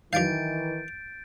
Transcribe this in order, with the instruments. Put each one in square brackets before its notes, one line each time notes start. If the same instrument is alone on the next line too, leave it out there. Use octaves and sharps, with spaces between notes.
[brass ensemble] D#3 E3 [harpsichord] F#3 F5 [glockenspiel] G6 A6 D7